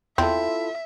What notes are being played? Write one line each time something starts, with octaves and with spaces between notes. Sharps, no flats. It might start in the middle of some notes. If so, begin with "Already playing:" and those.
E2 C4 E4 F4 A4 E5